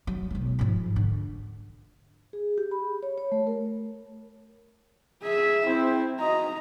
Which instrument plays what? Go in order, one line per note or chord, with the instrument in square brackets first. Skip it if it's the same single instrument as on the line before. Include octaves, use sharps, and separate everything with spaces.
[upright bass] F#3
B1 G#3
G#2 F3
D3
[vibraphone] G#4
G4
B5
C#5
C#5
A3
A#4
[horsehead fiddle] G#4 E5
[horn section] C4 [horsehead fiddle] E4
[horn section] D#4 F#4 D#5 [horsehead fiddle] A#5